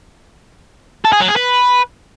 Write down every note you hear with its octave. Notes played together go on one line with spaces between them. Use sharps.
A4
G#4
F#3
G#4
B4